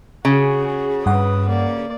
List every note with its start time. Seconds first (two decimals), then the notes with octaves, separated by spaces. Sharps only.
0.25 C#3 F#4 G#4
1.06 G2 B4 F#5 D#6
1.49 A#3 D5